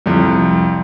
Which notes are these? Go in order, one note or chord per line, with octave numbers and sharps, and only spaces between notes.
C2 F2